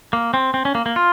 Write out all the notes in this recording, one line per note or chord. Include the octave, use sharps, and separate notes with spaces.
A#3
C4
C4
C#4
A#3
A#3
F4